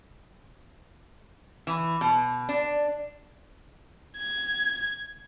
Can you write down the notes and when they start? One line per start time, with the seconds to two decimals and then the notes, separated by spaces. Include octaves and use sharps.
1.67 E3
2.01 B2
2.49 D4
4.18 G#6